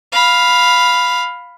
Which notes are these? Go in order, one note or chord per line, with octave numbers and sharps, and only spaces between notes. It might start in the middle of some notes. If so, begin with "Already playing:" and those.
F5 B5